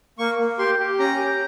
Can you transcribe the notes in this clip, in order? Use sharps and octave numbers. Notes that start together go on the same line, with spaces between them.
A#3 C#6
A#3
G4 C6
G4
C#4 A#5
G4